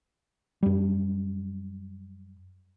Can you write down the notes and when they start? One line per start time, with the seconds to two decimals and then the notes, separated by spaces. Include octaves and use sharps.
0.63 F#2 G3